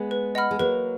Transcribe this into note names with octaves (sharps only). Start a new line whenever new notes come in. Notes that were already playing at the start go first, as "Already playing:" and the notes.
Already playing: G#3 B3
B4
D#5 F#5 B5 F6
G#3
F#3 A#3 B4